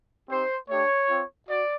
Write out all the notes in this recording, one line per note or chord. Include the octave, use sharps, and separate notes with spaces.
C4 D#4 G4 C5
A3 D4 G4 C#5
C4 F4
F#4 D5